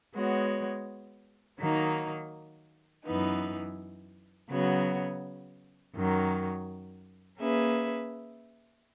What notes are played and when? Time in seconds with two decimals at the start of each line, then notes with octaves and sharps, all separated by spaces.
0.15 G#3 B3 F#4 C#5
1.60 D#3 F#3 A#3 D#4
3.05 F#2 E3 B3 D#4
4.49 C#3 F#3 B3 F#4 C#5
5.94 F#2 D#3 F#3
7.38 A#3 C#4 G#4 B4 E5